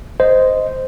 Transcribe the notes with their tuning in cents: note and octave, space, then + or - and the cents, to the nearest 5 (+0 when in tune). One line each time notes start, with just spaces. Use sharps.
C5 -10 D#5 +0